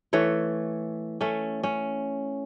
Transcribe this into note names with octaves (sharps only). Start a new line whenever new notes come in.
E3 A3 C#5
A3 C#4
C#4